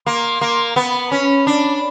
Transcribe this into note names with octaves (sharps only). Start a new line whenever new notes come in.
A#3 C6
A#3
A#5
B3 B5
B5
A#5
C#4 B5
B5
D4